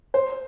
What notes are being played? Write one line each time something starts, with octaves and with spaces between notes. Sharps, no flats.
C5